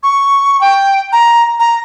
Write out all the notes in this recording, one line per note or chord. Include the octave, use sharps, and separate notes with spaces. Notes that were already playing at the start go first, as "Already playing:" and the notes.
C#6
G5
A#5
A#5